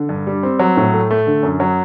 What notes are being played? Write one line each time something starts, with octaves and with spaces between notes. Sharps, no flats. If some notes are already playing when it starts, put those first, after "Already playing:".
Already playing: D3
G2
G3
C4
F#3
A2
A3
A3
D3
F#2
F#3